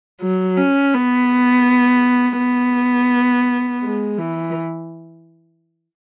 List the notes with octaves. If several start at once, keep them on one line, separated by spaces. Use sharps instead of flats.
F#3
C#4
B3
B3
G#3
E3